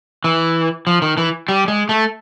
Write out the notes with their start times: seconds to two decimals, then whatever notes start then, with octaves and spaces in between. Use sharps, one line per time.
0.24 E3
0.87 F3
1.02 D#3
1.17 E3
1.49 G3
1.68 G#3
1.89 A3